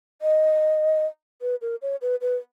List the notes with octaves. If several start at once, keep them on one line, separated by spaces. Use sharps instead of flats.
D#5
B4
A#4
C#5
B4
B4